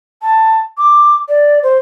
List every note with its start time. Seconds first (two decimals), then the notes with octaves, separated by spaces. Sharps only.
0.22 A5
0.78 D6
1.29 D5
1.63 C5